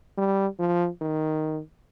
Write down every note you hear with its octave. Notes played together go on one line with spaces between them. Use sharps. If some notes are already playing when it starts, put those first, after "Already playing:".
G3
F3
D#3